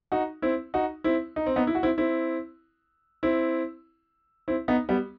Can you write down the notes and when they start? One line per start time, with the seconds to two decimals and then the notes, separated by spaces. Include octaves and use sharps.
0.12 D#4 F#4
0.42 C4 E4
0.74 D#4 F#4
1.04 C4 E4
1.36 D#4
1.46 C4
1.56 B3 D#4
1.67 E4
1.75 F#4
1.83 C4 E4
1.98 C4 E4
3.23 C4 E4
4.48 C4 E4
4.68 B3 D#4
4.89 G3 B3